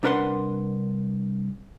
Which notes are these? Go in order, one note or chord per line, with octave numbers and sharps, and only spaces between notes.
C2 D4 A#4 B4 F#5 C6